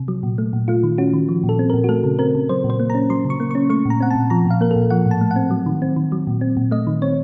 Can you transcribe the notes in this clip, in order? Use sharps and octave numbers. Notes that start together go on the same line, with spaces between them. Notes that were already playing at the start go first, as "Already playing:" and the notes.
Already playing: C3
F#3
A#2
A3
A#2
A3 F4
D#3
C#4 F#4
D#3
F3
A#2
A4
C4
A#2 A#4
F#4
A3 A4
C#3
C4 A#4
C#3
F#3 C5
A#2
C5
A#3
C#4 A#5
F#3 C6
C#3
C#6
A#3
C#4 C#6
A3 C#6
A#2 A#5
C4 F#5
A#2 A5
F3 A#5
A#2 F5
A#3 A#4
A4
A#2
F3 F#5
A2
A5
A3
F#5
C4
F#3
D#3
C4
D#3
F#3
A#2
C4
A#2
A3 D#5
D#3
C4 C#5